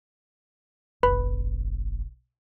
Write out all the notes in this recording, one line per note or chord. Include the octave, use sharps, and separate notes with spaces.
F1 A#1 B4 B5